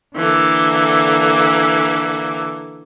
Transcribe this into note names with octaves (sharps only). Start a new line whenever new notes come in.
D3 E3 A#3 A4